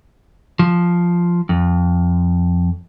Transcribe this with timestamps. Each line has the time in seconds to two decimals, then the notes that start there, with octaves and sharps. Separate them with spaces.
0.59 F3
1.49 F2